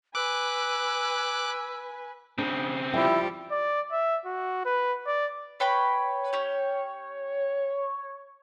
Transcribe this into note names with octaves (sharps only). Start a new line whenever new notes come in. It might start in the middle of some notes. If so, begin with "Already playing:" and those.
B4 G#5 D6 E6 F#6
C#3 C4 D4
F3 G3 E4 G5
D5
E5
F#4
B4
D5
B4 C#5 G5 B5
C#4 G4